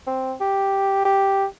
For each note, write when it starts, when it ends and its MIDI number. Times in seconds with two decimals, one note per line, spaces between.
0.07 0.34 60
0.41 1.02 67
1.06 1.45 67